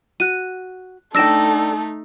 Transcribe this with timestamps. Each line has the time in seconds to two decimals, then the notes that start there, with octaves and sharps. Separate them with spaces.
0.20 F#4 F#6 D#7
1.15 A3 D4 D#4 A4 G5 E6 A#6 E7